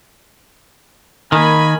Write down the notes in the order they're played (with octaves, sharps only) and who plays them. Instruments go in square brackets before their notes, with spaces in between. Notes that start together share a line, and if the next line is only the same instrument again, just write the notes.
[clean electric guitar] D#3 [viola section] A#3 G#5 B5